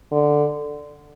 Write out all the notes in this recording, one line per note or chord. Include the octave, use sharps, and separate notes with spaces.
D3